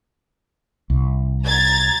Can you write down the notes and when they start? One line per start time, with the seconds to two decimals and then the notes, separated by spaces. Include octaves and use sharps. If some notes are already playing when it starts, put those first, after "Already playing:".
0.90 C2
1.44 A#5 G#6 A6